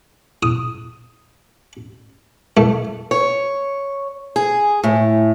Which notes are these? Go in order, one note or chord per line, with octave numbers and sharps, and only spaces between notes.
D#6
A3
C#5
G#4
A2